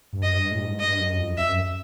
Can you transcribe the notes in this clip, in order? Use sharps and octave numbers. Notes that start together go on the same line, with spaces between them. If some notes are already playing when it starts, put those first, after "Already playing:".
G2
F#2 D#5
G2
A2
G2
G#2
G2 D#5
F#2
F2
F2 E5
F#2